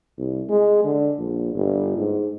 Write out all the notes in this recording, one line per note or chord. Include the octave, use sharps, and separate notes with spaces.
C2
G#3
D3
A#1
G1
G#2